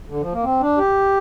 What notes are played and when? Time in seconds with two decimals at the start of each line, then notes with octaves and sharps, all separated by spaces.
0.10 D3
0.21 F3
0.32 A#3
0.43 C4
0.61 D4
0.78 G4